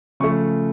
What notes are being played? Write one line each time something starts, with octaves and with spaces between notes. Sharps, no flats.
C#3 F3 A3 C#6